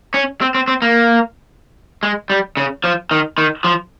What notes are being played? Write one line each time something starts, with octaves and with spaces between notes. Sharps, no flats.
C#4
C4
C4
C4
A#3
G#3
G3
C#3
F3
D#3
D#3
F3